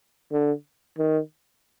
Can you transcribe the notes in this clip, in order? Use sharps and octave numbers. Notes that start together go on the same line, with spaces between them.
D3
D#3